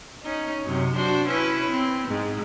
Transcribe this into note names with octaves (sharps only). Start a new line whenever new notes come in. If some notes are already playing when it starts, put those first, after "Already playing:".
C#4 D#4
F#2 C3
D4 F#4 C5
C#4 E4 B4
C4
G#2